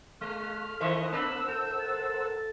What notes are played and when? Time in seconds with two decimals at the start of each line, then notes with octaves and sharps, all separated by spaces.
0.21 G#3 F5 F6
0.80 D#3 E4 A#4 C5 D#5 E5 F#5 C#6
1.12 A#3 B3 D4 B5 E6
1.48 A4 G6
1.79 A6